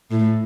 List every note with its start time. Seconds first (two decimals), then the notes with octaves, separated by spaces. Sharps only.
0.11 A2